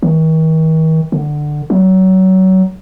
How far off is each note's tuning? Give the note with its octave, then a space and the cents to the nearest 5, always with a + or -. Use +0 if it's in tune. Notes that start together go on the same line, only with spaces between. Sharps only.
D#3 +45
D3 +15
F#3 +25